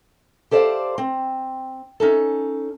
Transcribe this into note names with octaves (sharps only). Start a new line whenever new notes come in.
G4 A4 C5 D5 F5
C4
C#4 D#4 A4